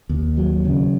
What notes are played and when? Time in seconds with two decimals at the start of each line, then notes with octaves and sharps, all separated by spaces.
0.09 D#2
0.37 F#3
0.65 C#3